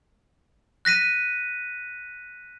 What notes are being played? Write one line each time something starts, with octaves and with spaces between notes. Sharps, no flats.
F#6 A#6 B6 D#7